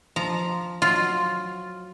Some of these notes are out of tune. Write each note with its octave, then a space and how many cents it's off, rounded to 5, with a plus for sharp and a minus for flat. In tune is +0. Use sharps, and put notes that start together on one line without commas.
F3 +0 A#5 +0
F#3 -15 F4 +0